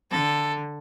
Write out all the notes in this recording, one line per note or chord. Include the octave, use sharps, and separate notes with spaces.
D3 A4